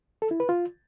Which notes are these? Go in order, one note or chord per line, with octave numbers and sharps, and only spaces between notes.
A4
E4
B4
F4